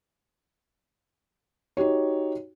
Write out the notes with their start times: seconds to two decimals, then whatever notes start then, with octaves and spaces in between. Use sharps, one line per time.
1.77 D#4 F#4 G4 C#5